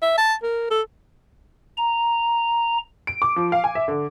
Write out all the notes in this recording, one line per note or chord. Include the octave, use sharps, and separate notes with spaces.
E5
A5
A#4
A4
A#5
D7
D6
F3
F5
G#5
E5
D3